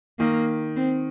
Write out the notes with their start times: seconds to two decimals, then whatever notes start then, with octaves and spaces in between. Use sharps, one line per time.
0.19 D#3 A#3
0.76 C4